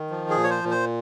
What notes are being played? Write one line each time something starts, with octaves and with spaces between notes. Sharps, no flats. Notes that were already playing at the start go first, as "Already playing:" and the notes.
Already playing: D#3
F3
G#4
A#2
C#5
C5
A#2
C5